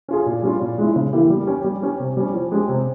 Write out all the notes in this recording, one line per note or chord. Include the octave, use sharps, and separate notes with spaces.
C#4 F4 G#4
A#2
G3 C#4 F4
A#2
G#3 E4
C#3
E3 A#3 E4 G4
G3
C#4 G4
G3
C#4 G4
C3
G3 C#4
F3
G#3 C#4 G4
C3